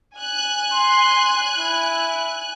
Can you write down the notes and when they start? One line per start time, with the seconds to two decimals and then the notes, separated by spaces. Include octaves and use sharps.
0.16 G#5 F#6
0.73 C6
1.57 E4